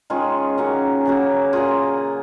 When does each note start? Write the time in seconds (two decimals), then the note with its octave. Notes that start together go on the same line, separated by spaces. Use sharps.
0.10 D#3 G#3 C#4 F4 G#4
0.58 D#3 F#3 A#3 C#4
1.05 C#3 F#3 A#3
1.53 A#2 F#3 A#3 F4 G#4